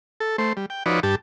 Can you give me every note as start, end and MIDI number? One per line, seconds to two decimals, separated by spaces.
0.20 0.36 69
0.38 0.53 57
0.38 0.53 72
0.57 0.66 55
0.70 0.83 79
0.86 1.00 53
0.86 1.00 63
0.86 1.00 66
0.86 1.00 71
0.86 1.00 73
0.86 1.00 74
1.03 1.15 43
1.03 1.15 67
1.03 1.15 81